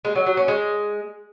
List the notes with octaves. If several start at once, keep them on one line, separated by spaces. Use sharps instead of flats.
G#3
F#3
F#3
C#4
G#3